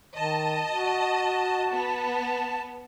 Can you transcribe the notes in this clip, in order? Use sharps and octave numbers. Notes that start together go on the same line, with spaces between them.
D#3 D#5 A5
F#4
B3